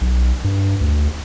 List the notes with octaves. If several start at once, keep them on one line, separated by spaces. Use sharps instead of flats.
B1
G2
D2